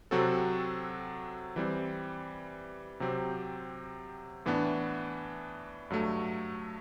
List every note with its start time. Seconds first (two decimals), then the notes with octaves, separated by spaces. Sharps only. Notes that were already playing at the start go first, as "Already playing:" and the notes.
0.11 C3 F#3 C4 F#4 A4
1.56 E3 G3 C4
3.00 C3 F#3 C4 G4
4.45 A2 E3 B3 D4
5.90 G2 F#3 A3